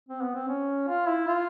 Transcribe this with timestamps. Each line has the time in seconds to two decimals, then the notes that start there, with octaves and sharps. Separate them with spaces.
0.09 C4
0.22 B3
0.35 C4
0.48 C#4
0.88 F4
1.07 E4
1.28 F4